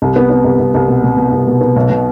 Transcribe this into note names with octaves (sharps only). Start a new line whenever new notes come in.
C2
B3
B3
C2
C2
C2
B2
B2
B2
C2
B2
B3
B1
B2